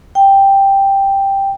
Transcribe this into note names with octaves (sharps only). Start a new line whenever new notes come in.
G5